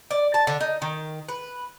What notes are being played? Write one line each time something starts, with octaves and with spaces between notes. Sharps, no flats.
D5
A5
D3
D#4
D#3
B4